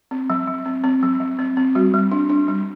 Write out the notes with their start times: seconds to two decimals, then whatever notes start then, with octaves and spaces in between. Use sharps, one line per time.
0.11 C4
0.30 F#3
0.47 F#3
0.66 C4
0.84 C4
1.03 F#3
1.20 F#3
1.39 C4
1.57 C4
1.75 G3 F#4
1.94 G3
2.12 D4
2.30 D4
2.48 G3